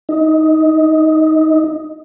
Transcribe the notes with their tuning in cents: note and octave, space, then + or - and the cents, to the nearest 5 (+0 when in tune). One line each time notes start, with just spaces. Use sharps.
D#4 +10